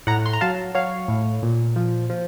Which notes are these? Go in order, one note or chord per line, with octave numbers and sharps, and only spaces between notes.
A2 F#5 A#5
C6
A#5
F#3 F5 A5
F#3 C#5 F5
A2
A#2
F3
F3